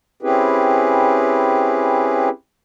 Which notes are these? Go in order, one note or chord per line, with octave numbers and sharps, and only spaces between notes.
C4 C#4 E4 G4 G#4 B4